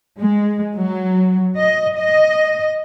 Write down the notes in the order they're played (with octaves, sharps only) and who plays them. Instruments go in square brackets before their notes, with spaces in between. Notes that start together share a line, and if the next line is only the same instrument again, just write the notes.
[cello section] G#3
F#3
D#5
D#5